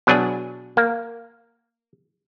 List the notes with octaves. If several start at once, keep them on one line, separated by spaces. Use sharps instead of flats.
B2 F#3 D4 G#4
A#3